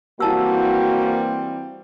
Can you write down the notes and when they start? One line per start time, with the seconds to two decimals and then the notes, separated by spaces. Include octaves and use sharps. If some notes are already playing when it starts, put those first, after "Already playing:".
0.20 E3 G3 A#3 C4 E4 F#4 A5 E6